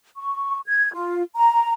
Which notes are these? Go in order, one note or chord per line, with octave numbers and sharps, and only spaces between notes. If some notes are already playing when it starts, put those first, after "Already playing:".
C#6
G#6
F4
A#5